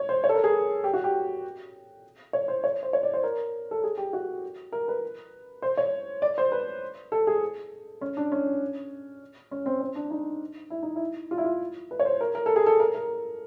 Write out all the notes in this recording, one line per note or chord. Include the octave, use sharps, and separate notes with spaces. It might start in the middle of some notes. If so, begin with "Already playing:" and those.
Already playing: C#5
C5
C#5
A4
A#4
G#4
G4
F#4
G4
C#5
C5
C#5
C5
C#5
D5
C5
A#4
A4
G#4
G4
F#4
A#4
B4
C5
C#5
D5
C5
B4
A4
G#4
C#4
D4
C#4
C#4
C4
C4
D4
D#4
E4
D#4
E4
F4
E4
F4
B4
C#5
C5
A#4
A#4
A4
G#4
A4
A#4
A#4